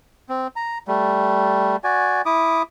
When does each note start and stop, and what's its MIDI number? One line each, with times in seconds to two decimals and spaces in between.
0.29 0.47 60
0.56 0.78 82
0.88 1.76 55
0.88 1.76 57
1.84 2.22 66
1.84 2.22 74
1.84 2.22 80
2.26 2.63 64
2.26 2.63 86
2.26 2.63 87